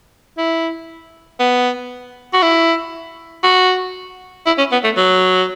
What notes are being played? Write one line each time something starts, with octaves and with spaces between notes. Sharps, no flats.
E4
B3
F#4
E4
F#4
E4
C#4
B3
A3
F#3